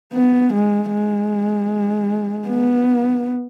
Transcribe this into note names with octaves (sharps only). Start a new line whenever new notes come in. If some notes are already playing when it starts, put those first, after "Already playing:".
B3
G#3
G#3
B3